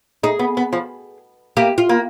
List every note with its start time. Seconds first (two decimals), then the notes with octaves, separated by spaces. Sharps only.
0.23 D#4 G#4
0.39 B3
0.57 B3
0.73 F3
1.57 A#3 G4
1.78 F4
1.89 A#3